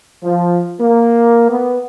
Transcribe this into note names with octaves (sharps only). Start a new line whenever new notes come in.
F3
A#3
B3